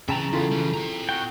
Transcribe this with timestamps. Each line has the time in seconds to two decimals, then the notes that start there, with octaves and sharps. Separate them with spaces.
0.09 C#3 E3 E5 G5 A5 A#5
0.32 E2 E4 F4 A4
0.52 E3 G3
0.74 C4 A#5
1.09 F#4 G5